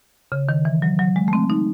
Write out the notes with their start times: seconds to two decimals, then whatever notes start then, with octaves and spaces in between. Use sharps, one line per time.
0.32 C#3
0.49 D#3
0.65 E3
0.82 F#3
0.99 F#3
1.16 G#3
1.28 A3
1.33 C4
1.50 D#4